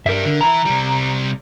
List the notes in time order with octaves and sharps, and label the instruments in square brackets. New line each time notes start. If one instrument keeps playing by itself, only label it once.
[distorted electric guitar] G2 G3 [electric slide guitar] A#4 E5
[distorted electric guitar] D3
[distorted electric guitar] E3 E4 [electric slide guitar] A#5
[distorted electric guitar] C3 G3